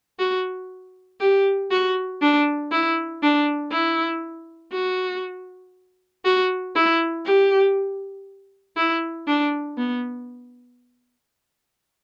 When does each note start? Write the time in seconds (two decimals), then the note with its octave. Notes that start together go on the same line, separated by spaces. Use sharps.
0.19 F#4
1.20 G4
1.71 F#4
2.21 D4
2.72 E4
3.23 D4
3.72 E4
4.73 F#4
6.25 F#4
6.75 E4
7.26 G4
8.77 E4
9.27 D4
9.78 B3